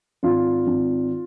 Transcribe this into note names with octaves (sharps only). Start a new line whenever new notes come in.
G#1 F4
G#1